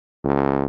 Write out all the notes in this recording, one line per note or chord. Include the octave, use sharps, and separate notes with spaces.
C#2